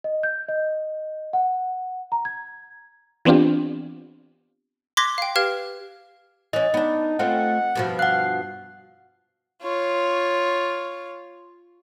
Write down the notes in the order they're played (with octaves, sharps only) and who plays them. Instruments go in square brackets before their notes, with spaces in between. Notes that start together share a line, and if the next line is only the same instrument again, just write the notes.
[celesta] D#5
G6
D#5
F#5
A#5
G#6
[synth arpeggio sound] E3 B3 C4 D4 F4 G4
[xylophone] C6 D6 F#6 G#6 A#6 B6
F5 G5
G4 B4 F5 F6 G#6
[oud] E3 C#4 [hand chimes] D#5
[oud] B3 D4 [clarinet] D#4
[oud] A3 C4 F4 [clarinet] F#5
[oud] G2 B2 F3
[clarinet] F5 [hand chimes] F#5 F#6
[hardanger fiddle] F4 C#5